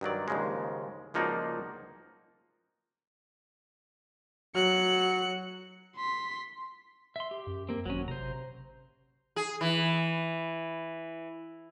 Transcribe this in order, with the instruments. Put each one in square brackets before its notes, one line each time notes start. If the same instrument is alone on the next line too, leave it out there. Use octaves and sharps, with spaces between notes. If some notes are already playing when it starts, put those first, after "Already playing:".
[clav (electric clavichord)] G2 D#3 F#3 D5
D#2 G#2 C#3 F3 G#3
C#2 F3 A#3 D#4 F#4 D5
[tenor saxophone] F#3 [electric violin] F#6 C#7
[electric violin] C6 B6
[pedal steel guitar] E5 C6
G4
[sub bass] F#2
[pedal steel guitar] A#3 C4
[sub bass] G#1 [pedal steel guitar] F#3 C#4
[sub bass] C3 [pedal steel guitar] C5 A#5
[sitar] G#4
E3